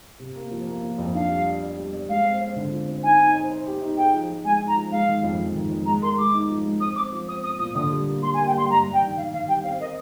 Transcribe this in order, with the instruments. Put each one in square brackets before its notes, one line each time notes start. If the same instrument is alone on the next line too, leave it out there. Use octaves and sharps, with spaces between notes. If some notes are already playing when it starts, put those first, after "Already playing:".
[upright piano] C3
A#3
F3
A#3
F3
F2
[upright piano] D4 [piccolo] F5
[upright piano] G3
D5
D5
G3
D5
[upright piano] G#3 [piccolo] F5
[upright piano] C4
C4
D3
F4
C4
[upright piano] D#4 [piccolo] G#5
[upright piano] D#4
C5
C5
G4
D#4
[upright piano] G#4 [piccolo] G5
[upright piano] F3
F3
[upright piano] G#3 [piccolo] G#5
[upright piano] D#4
[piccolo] A#5
[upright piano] F3
[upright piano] G#3 [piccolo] F5
[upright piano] D#3
F2
F2
D#3
F2
[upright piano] G#3 [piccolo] A#5
[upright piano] A#4 [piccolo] C6
[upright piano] G#3 [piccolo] D6
[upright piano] D#4
F3
G#3
[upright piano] C4 [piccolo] D#6
[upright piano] C4 [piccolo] D6
[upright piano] F3
[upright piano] C4 [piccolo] D#6
[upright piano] C4 [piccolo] D#6
[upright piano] A#2 [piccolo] D#6
[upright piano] D3 [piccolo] D#6
[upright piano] G3
A#3
[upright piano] G3 [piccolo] C6
[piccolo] G#5
[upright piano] A#3
[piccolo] G5
[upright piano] G3 [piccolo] C6
[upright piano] G2 [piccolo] A#5
[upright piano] G2
[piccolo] G5
[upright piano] D#3
[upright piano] D#3 [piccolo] F5
[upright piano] D#3 [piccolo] F5
[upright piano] G3 [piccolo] G5
[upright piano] C4 [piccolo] F5
[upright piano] A#4 [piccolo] D#5